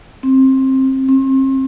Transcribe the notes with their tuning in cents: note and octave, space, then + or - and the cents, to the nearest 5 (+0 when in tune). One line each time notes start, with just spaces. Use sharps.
C4 +20
C4 +40